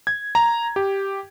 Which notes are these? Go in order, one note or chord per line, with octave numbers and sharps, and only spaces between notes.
G#6
A#5
G4